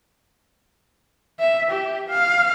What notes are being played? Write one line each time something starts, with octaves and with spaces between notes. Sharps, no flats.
E5
G4
F5